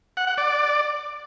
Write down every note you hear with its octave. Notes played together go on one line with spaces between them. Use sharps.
F#5
F#5
D5